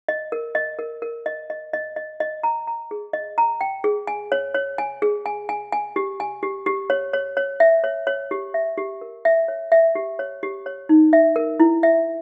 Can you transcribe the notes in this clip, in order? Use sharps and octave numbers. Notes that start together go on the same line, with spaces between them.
D#5
A#4
D#5
A#4
A#4
D#5
D#5
D#5
D#5
D#5
A#5
A#5
G#4
D#5
A#5
G5
G#4
G#5
C#5
C#5
G#5
G#4
G#5
G#5
G#5
G4
G#5
G4
G4
C#5
C#5
C#5
E5
C#5
C#5
G4
E5
G4
A#4
E5
C#5
E5
G4
C#5
G4
C#5
D#4
E5
A#4
E4
E5